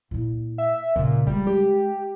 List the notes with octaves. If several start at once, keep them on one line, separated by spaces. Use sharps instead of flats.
A#2 E4
E5
D#2 A#2 C#3
G3 G#3
G4